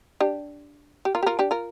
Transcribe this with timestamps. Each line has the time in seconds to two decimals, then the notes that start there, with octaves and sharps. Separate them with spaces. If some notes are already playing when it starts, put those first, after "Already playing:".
0.20 D4 G4
1.05 G4
1.15 F4 A#4
1.23 G4
1.26 F4 A#4
1.39 D4 G4
1.51 F4 A#4